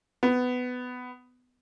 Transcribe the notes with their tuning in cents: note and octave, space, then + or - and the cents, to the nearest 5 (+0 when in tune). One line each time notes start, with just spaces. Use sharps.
B3 +15